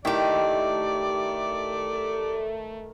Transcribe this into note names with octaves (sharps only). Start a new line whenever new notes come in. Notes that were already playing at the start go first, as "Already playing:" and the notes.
D#3 A3 E4 G4 D5